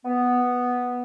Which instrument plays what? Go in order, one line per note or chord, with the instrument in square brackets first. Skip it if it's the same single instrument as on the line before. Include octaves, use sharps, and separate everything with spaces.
[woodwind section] B3